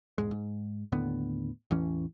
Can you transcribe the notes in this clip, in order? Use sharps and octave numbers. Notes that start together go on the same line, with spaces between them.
E1 G#2 G#3
G#2
D#2 A2 D3 B3
A1 E2 E3 C#4